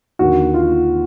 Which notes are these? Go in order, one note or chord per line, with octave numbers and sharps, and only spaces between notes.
D#2 D3 F#4
F4